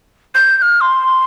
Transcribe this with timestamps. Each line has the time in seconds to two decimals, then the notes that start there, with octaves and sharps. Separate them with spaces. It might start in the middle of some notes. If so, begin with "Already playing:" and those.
0.35 G6
0.57 G6
0.62 F6
0.81 C6